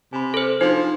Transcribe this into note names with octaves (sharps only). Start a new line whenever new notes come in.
C3 G#5 B5
A4 C5
F3 D4 D#4 F#4 C5